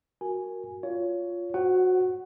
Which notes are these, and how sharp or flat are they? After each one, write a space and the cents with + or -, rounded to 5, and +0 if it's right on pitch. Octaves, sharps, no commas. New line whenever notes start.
F#4 +0 A#4 +0 G#5 +0
F4 +0 C#5 +20
F#4 -15 C5 +0 F#5 +15